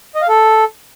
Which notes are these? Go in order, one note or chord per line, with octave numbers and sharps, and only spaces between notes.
D#5
F5
A4